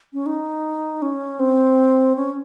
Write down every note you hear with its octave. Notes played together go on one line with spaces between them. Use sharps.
C#4
D#4
C#4
C4
C#4